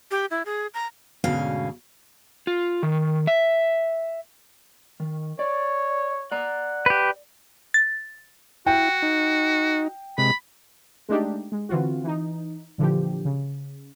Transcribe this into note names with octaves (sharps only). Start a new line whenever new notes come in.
G4
E4
G#4
A#5
D2 G#2 B2 C#4 F5
F4
D#3
E5
D#3
C#5 D5
D5 F#5 A#5
G4 B4
A6
E4 F#4 G5
D#4
C3 G#3 B5
G#3 A3 D4 D#4 G4
G#3
D3 E3 C4 F4 F#4
E3 D#4
A#2 D3 E3 F3 G4
C#3